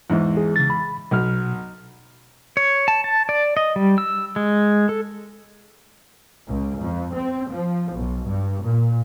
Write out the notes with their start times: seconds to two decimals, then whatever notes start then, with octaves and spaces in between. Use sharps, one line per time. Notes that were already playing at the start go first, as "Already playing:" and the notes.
0.10 E2 G#2
0.37 G#4
0.56 C#3 A6
0.70 B5
1.11 B1 B2 F#3 F6
2.57 C#5
2.88 A5
3.04 A5
3.29 D5
3.57 D#5
3.76 G3
3.98 E6
4.36 G#3
4.89 A4
6.47 C#2
6.80 F2
7.15 C4
7.50 F3
7.92 B1
8.27 G2
8.64 A#2